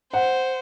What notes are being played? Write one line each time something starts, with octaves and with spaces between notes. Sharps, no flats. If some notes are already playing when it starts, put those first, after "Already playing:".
C5 F#5